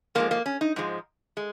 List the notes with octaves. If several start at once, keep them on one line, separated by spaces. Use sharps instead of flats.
G#2 F3 G#3 A#3
A#3
C#4
D#4
G#2 F3 G#3
G#3